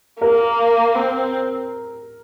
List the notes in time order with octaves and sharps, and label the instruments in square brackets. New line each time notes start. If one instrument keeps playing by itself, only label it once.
[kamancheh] A#3 [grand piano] A#4
[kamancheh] C4